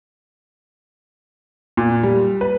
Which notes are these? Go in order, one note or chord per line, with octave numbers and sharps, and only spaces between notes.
A#2
G3
B4